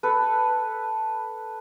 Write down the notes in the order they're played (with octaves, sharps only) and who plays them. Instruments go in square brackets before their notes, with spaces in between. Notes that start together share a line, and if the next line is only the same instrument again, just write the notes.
[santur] A4 B4